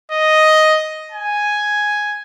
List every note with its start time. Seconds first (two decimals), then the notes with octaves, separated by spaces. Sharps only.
0.11 D#5
1.12 G#5